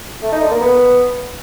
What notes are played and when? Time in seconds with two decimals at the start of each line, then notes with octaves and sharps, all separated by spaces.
0.22 A3
0.32 D#4
0.41 D3
0.51 A#3
0.60 B3